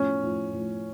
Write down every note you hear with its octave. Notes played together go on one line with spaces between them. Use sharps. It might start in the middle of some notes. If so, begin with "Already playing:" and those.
Already playing: A2 F3 C#4
A2 F3
A2 F3